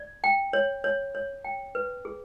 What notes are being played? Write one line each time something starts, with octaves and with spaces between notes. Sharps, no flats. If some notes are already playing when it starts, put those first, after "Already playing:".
Already playing: D5
G5
C#5
C#5
C#5
G5
B4
G#4